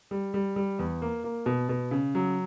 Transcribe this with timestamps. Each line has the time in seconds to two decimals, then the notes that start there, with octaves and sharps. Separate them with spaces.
0.11 G3
0.34 G3
0.56 G3
0.79 E2
1.02 A#3
1.24 A#3
1.46 B2
1.69 B2
1.91 C#3
2.15 F#3